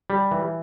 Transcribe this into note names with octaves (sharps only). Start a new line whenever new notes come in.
G3
E3